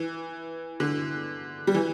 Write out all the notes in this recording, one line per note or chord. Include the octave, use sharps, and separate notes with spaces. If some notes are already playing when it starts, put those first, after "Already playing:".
Already playing: E3
D3
G3
E3